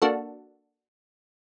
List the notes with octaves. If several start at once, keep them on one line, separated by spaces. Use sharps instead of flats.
A#3 D4 F#4 A4